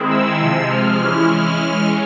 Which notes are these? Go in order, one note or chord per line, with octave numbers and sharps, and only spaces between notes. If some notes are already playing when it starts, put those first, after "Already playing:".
Already playing: D#3 G#3 C4 E4
E6
C3 F3 G#3
F6
E3 G#3 C#4 E4
F6
E3 G#3 C#4